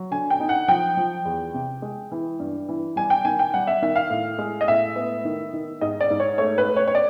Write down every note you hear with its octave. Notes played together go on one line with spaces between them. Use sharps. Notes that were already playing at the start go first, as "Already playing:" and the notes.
Already playing: F#3
D3 G#5
G5
D#4
F#5
F3 G5
F3
E2
C3
G#3
E3
G2
E3
G3 G#5
G5
D#3 G#5
G5
G3 F#5
E5
D#3 E5
F5
A2
G#3
D#5
A2 E5
B3
D#3
D#3
G#2 D#5
D5
G#2
C#5
A3 C#5
B4
A3
C#5
C#5
D5